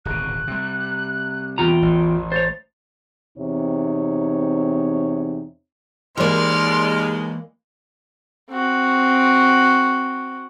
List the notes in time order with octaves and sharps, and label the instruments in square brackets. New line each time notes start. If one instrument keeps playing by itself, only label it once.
[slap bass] D1 G#1 B2 [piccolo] F#6
[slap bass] C3 G3
[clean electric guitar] E2 F4 A#5 [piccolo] G5
[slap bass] A1
[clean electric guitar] C5 C#5 [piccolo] A6
[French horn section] E2 C3 C4 D#4 C#5
[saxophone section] D#2 G#3 [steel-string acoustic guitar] E3 A#3 [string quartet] D5 F6 [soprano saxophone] C6
[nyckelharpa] C4 F#4